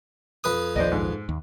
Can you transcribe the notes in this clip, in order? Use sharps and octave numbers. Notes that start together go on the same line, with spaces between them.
F2 B4 D#6
A#1 D#2 F3 C5 D5 D#5
G#2
D#2